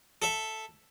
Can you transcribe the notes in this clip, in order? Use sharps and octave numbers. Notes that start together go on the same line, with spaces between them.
A4 E5